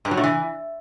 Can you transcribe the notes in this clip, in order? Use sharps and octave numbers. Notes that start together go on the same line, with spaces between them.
G2
F#3
A2
E3